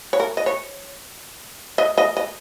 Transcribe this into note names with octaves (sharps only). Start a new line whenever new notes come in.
C#5
A#4
D#5
C#5
D#5
D#5
D#5